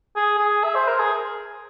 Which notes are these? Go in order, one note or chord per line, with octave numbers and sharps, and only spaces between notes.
G#4
G#4
E5
C5
A#4
G#4